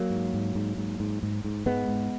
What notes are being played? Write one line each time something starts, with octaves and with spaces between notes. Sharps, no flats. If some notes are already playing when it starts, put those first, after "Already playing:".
Already playing: F#3 A#3
G#2
G#2
G#2
G#2
G#2
G#2
G#2
G#2 G#3 B3
G#2